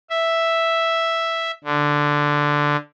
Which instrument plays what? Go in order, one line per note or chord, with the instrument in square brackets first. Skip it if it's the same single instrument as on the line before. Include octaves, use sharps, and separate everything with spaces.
[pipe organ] E5
D3